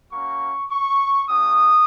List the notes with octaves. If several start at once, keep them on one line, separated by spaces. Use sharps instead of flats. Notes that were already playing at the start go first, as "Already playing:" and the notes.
A#3 C#4 F#4 C#6
C#6
A3 C#4 F#4 D#6